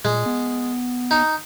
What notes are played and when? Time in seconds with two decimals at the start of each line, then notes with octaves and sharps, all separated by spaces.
0.05 A#2 G#3
0.26 B3
1.11 D#4